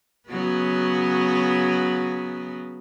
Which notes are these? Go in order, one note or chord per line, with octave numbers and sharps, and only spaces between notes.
C#3 F#3 B3